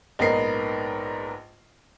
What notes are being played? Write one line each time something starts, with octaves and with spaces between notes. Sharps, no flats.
A#1 G#2 B3 D#4 A#4 C7